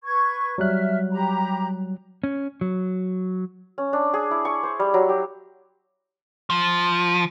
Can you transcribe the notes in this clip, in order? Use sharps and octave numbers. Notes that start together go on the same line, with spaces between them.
B4 C#6 G#6
F#3 G3 E5 F6 F#6
G4 A#5 B5
C#4
F#3
C#4
D4
G#4
E4
C#6
C5
G3
F#3
G4
F3